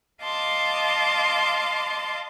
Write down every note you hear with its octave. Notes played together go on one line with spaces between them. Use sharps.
D#5 F5 A5 C6 D6